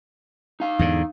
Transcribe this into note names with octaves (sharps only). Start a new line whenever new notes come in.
D#4 F5
E2 G#2 D3